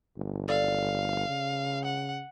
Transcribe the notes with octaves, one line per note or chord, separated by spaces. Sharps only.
G1
A4 D5 F5
C#3
F#5